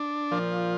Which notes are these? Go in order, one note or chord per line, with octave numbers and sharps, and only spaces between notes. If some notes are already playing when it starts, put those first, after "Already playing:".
Already playing: D4
A#2 F3